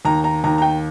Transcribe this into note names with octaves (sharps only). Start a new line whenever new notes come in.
D#2 A#5
A#5
D#2 A#5
A#5
G5